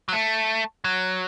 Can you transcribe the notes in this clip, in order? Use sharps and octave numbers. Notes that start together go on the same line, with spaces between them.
F#3
A3
F#3